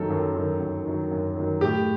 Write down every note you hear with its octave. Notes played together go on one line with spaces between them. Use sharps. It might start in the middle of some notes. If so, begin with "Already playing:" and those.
Already playing: F#2 D#3 F#3 A4
F#2
D#3 F#3
F#2
D#3 F#3
F#2
D#3 F#3
A2 G4